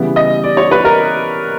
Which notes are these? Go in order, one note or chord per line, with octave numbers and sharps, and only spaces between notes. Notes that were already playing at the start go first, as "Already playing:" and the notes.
Already playing: C#3 E3 G3 B3
D#5
D5
C#5
B4
A#4